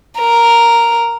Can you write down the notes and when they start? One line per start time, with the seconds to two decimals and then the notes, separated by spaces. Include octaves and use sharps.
0.20 A#4